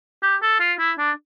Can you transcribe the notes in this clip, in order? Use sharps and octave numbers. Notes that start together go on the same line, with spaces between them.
G4
A4
F4
E4
D4